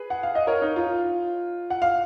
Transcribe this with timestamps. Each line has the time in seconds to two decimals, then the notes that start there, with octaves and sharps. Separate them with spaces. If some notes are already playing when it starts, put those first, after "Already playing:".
Already playing: G#4 B4
0.10 F#5
0.23 F5
0.35 D#5
0.47 A#4 C#5
0.62 D#4
0.76 F4
1.70 F#5
1.82 F5